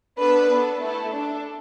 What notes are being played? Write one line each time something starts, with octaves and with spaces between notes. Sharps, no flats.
B3 D4 A4 B4
B3 D4 A4
A3 E4 A4
D4 A4